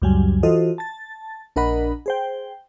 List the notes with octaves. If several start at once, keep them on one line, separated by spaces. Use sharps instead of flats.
C#2 F#2 F#3 G3 G#5
E3 F4 F#4 A4 C5 D#5
A5 A6
A#1 D4 A#4 D#5 F#5 B5
G#4 C5 G5